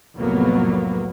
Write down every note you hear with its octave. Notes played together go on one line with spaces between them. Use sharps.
C2 F2 A2 F#3 A#3 B3